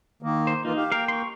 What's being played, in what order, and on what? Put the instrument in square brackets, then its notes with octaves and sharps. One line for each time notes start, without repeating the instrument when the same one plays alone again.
[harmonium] D#3 A#3
[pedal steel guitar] C5
[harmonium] E3 A#3 F4 [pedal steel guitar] D#4
[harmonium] G4 F5
[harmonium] A#3 G5 [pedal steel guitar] A#4 F5
[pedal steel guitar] C6 C#6